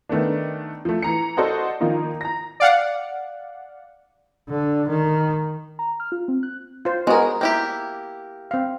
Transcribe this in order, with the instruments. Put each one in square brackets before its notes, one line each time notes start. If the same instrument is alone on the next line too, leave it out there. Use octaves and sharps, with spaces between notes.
[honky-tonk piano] D#3 A3 B3 D4
F3 A3
E3 A#5 C#7
F#4 A4 C5 D5 D#5 F#5
D#3 F3 A#3 D#4 F4
A#5 A#6
[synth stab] D5 F5 F#5
[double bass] D3
D#3
[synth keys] A#5
F6
F4
C4
F#6
[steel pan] F4 C5
[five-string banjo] G#3 G#4 [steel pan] B3 F#4 A#4
[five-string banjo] A#3 E4 G4 [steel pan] G5
[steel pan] C4 F5